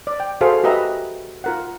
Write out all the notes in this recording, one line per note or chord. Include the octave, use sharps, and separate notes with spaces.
D5
G5
F#4 G#4 A4 C5 F5
F#4 G4 B4 D#5 E5 A#5
F4 A#4 F#5